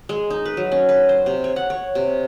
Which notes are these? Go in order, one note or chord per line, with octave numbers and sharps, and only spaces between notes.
G#3
D#4
B4
F#3
C#4
B4
C5
C3
C#5
F#5
C#5
C3